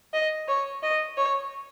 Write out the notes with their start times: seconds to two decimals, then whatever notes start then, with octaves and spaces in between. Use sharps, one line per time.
0.13 D#5
0.48 C#5
0.83 D#5
1.17 C#5